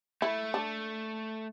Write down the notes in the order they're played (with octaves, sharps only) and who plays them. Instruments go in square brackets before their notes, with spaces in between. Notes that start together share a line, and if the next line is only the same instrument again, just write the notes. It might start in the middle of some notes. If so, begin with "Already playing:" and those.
[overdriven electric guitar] A3 [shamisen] E4
[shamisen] D4